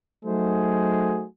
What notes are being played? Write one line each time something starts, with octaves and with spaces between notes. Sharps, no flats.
F#3 A3 D#4 F#4 G#4 C5